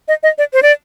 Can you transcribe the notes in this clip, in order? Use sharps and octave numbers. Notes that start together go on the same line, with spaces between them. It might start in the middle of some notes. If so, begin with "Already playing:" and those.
D#5
D#5
D5
C5
D5